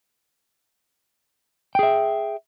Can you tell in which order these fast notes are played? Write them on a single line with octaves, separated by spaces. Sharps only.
G5 G#4 E5